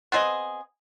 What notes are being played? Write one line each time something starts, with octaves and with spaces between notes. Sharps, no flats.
B3 C4 G#4 D#5